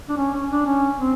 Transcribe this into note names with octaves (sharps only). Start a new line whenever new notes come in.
D4
C#4
C#4
D4
C#4
C4